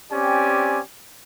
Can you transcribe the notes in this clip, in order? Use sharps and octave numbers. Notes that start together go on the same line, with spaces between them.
C4 C#4 G4 D5 G5 G#5